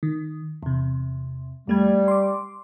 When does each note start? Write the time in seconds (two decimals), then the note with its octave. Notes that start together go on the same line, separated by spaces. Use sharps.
0.03 D#3
0.63 E2 C3
1.67 F2 G3 A3 G#6
2.08 C6 D6